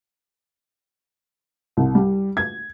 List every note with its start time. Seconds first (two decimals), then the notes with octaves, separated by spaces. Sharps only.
1.77 C2
1.95 G3
2.37 G#6